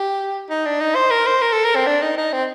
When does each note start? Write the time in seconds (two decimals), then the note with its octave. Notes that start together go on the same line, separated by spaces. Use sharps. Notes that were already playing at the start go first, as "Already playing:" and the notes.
Already playing: G4
0.50 D#4
0.66 D4
0.80 D#4
0.95 C5
1.11 A#4
1.26 C5
1.42 A#4
1.53 A4
1.65 A#4
1.76 C4
1.86 D4
2.02 D#4
2.18 D#4
2.33 C4